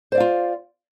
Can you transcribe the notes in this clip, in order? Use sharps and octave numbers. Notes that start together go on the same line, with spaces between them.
F4 C5 D5 F5